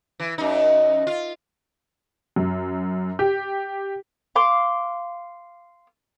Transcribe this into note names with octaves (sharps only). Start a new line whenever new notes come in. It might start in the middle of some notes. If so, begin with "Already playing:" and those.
E3
F#2 D#4
F4
F#2
G4
F5 C6 D6